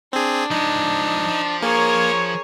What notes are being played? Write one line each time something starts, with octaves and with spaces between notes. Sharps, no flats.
C4 D4 G#4
F3 G#3 D#4
F3
A#3 G#4 A#4 C#5